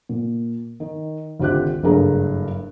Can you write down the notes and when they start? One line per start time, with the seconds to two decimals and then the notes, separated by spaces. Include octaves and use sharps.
0.09 A#2
0.80 D#3
1.39 G#1 D2 F4 G4 F#6
1.83 F#1 G2 A3 G#4 A#4 A#5